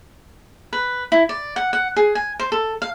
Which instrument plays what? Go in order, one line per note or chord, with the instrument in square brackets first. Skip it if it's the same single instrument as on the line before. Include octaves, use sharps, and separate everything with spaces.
[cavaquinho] B4
E4
D5
F#5
F#5
G#4
G#5
C5
A4
F5